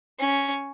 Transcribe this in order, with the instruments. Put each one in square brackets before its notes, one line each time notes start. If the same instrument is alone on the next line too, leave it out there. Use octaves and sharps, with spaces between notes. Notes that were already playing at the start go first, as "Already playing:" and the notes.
[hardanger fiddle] C#4